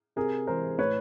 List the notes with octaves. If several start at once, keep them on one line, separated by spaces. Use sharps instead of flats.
C3 G#4 A#4
E3 G#3 A#4 C5
A2 B4 C#5